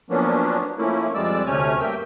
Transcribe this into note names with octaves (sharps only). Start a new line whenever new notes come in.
F3 F#3 A#3 B3 C#4 D4
F3 A3 A#3 C#4 E4
F2 G3 G#3 D5 E6
D2 C3 A3 C#4 G#5 F6
G2 A#3 E5 G5